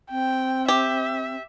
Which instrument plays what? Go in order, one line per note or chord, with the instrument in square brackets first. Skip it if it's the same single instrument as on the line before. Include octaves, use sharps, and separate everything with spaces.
[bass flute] C4 [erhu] G5
[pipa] G4 [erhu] E5